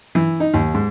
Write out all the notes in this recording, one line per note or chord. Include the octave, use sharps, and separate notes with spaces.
E3
D#4
D#2
G#2